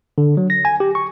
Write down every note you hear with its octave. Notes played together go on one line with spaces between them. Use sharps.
D3
F#3
A#6
G#5
G4
C#6